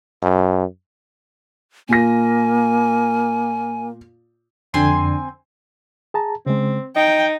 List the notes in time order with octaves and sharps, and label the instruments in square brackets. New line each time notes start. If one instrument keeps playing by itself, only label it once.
[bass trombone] F#2
[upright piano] A#2 F4 A#6 [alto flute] A#3 [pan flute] G#5
[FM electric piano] F2 D3 D4 [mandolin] C4 G#5 C6
[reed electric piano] G#4 A5 A#5
[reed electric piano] C#3 G#3 [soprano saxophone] C4
[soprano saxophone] D#4 [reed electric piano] D#5 [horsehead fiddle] G5